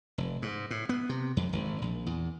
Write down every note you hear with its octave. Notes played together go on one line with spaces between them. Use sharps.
F1
G#2
A2
B3
C3
F2
G#1
A#1
E2